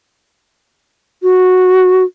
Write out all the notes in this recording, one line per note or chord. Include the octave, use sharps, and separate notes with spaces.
F#4